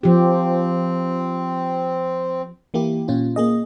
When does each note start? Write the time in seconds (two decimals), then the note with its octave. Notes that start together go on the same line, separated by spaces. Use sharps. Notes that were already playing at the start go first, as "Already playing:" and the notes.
0.03 F3 C4 G4
2.74 E3 A#3 E4 G4
3.08 A#2 C#4 F4
3.36 A#3 G#4 D#5